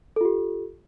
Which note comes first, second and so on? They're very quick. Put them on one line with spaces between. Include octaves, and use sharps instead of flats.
A4 F4 G4